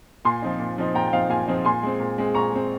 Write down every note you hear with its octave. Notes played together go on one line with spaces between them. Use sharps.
A#2 G#5 C6
F3 C4 D#4
A#2
F3 C4 D#4
A#2 G5 A#5
G5
F3 C4 D#4 F5
A#2 F5 G#5
F3 C4 D#4
A#2 G#5 C6
G#3 C4
A#2
G#3 C4
A#2 A#5 C#6
G#3 C4